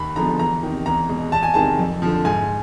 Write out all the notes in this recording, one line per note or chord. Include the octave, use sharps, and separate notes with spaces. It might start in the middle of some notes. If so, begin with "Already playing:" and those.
Already playing: D#2 B5
D3 F3 G#3 B3 A#5
E2 A#5
C3 D#3
E2 A#5
B2 G#3
E2 A5
G#5
C3 D#3 G#3 A5
F2
D3 F3
G#2 G#5